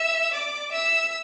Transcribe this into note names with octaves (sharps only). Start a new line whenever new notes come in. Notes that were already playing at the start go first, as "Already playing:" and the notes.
Already playing: E5 E6
D5 D6
E5 E6